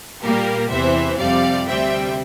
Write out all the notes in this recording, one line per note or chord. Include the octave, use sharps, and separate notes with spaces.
A#2 G3 A#3 G4 A#4
E2 C3 E3 C5 E5
F2 C3 G3 D5 F5
D2 C3 G3 C4 E5 G5